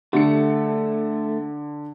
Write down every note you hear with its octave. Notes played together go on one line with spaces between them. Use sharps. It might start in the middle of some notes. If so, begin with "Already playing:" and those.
D3 A3 G4 C#7